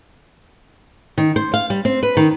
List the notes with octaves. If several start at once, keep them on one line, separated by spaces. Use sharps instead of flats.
D#3
C5
F5
G3
C4
B4
D#3